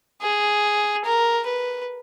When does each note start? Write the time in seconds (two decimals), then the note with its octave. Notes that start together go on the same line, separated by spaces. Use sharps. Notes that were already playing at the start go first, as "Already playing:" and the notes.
0.22 G#4
1.05 A#4
1.46 B4